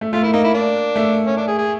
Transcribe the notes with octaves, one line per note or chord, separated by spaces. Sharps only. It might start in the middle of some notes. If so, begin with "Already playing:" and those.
A3
A3 F4
A#3 E4
A#3 D#4
E4
D4
A3
C#4
D4
G#4
G#4